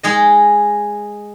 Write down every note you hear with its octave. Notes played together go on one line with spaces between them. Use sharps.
G#3 G#4 D#5